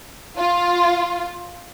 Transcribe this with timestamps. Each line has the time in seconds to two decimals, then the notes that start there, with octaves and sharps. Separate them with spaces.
0.36 F4